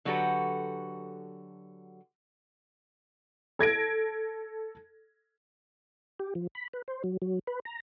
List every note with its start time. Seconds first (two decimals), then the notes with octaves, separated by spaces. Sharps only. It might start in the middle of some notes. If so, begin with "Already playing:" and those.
0.05 D3 F#3 F#4 G4 A4 B4
3.59 A4 G#6 A#6 D7
6.19 G4
6.35 F3
6.55 B5
6.73 B4
6.88 C5
7.04 F#3
7.22 F#3
7.47 B4
7.65 A#5